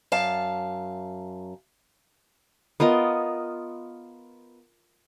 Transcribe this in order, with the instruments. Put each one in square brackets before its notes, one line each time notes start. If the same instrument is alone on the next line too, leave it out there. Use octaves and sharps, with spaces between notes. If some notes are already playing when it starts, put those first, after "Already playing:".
[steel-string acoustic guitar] F#2 F5 A5
[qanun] B3 F4 A#4 D#5